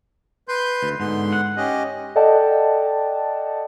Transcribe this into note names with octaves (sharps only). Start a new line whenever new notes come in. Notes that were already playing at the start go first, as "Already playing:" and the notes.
B4 C6 G6
D2
G#2 D3 B3 C6
F#5
C#4 G4 D#5
A4 D5 D#5 F#5 G5 A5